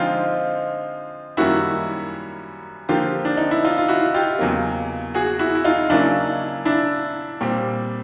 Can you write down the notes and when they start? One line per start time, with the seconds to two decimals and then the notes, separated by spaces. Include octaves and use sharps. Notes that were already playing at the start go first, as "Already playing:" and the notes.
Already playing: D3 F3 G#3 C4 D#4 F4
1.37 F#2 D#3 G3 A#3 C#4 E4 F#4
2.89 D3 F3 A#3 F4 G4
3.25 D4
3.37 D#4
3.51 E4
3.65 D#4 F4
3.78 F4
3.89 E4 F#4
4.14 F4 G4
4.39 E2 C#3 F#3 A#3
5.15 F#4 G#4
5.39 E4 F#4
5.55 E4
5.65 D#4 F4
5.90 C#3 F#3 A#3 C#4 D4 E4
6.65 D4 E4
7.41 A#2 G3 C4